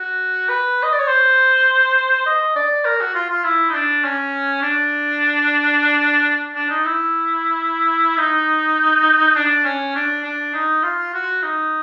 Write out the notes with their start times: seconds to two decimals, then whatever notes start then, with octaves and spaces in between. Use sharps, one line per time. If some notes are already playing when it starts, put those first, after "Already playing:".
Already playing: F#4
0.49 B4
0.83 D#5
0.92 D5
1.00 C#5
1.07 C5
2.26 D#5
2.56 D5
2.85 A#4
3.01 F#4
3.15 F4
3.30 F4
3.44 E4
3.70 D#4
3.74 D4
4.04 C#4
4.62 D4
6.55 D4
6.69 D#4
6.85 E4
8.18 D#4
9.36 D4
9.65 C#4
9.95 D4
10.24 D4
10.54 D#4
10.83 F4
11.14 F#4
11.43 D#4